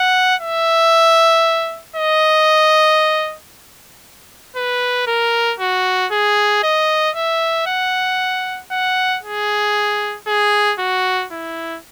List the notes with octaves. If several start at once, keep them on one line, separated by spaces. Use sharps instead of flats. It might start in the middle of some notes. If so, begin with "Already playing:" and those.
Already playing: F#5
E5
D#5
B4
A#4
F#4
G#4
D#5
E5
F#5
F#5
G#4
G#4
F#4
E4